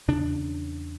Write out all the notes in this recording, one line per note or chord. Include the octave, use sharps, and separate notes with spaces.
E2 C#3 D4